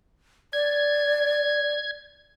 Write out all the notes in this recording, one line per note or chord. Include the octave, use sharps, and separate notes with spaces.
D5 G#6